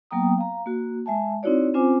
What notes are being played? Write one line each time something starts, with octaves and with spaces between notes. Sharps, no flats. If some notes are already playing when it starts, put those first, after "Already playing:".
F#3 A#3 B3 G5 A#5 D#6
F5 A#5
A#3 F#4
G#3 E5 G#5 A5
C4 D#4 E4 F#4 C#5 D5
C4 C#4 F4 C5 G#5 D6